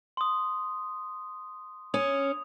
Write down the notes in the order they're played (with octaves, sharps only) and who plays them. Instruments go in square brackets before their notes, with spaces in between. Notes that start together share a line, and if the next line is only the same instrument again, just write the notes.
[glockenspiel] C6 D#6
[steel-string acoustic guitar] C#4 [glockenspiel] D#6 F7